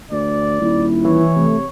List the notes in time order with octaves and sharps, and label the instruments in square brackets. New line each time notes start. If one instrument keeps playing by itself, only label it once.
[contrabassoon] D2 [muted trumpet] D5
[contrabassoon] D#1 [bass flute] E4
[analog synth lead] E3 [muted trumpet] C#5
[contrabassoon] C3 [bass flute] A3